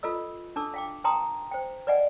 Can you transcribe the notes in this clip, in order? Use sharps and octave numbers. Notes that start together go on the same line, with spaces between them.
F4 A4 B4 D#5 E6
D4 A4 A5 D6 E6
F5 G5 D6
B4 G5 A5 A#5 C6 D#6
C5 G5
B4 D5 D#5 F#5 G#5